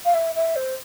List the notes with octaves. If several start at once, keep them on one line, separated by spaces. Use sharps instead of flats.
F5
E5
E5
C5